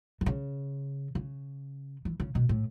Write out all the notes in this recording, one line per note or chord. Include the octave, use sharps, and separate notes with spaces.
E3
C#3
C#3
E3
C#3
B2
A2